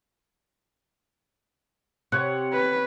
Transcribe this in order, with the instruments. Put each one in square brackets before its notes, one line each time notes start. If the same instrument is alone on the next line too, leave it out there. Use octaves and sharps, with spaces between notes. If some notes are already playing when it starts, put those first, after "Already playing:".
[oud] C3 [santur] C#5 F#5
[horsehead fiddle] B4